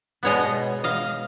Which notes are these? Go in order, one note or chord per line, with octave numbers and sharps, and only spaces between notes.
B2 G#3 B3 C#5 D#5
D#5 F5